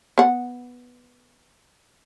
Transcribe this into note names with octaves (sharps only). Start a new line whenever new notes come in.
B3 F#5